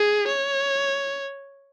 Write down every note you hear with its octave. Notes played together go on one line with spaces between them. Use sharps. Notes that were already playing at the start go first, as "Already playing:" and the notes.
Already playing: G#4
C#5